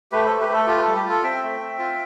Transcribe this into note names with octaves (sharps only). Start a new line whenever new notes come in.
A3 G4 B4
A3 A4 C5
G4 B4
A3 A4
F4 G4
B4
A4
G3
G4
F4
A4
C4 E5 G5
A3
C4
F4